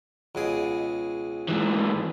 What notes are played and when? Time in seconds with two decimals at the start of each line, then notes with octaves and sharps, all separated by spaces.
0.35 C#2 B2 G#4
1.48 G#2 E3